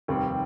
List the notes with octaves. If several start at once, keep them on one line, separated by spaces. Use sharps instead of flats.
F1 D#2 D#3 G3 C4